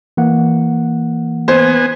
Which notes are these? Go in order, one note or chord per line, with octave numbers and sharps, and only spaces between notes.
E3 A#3 F#5
B3 C5 G#5